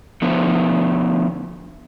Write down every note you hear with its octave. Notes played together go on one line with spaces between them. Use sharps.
D3 F3 B3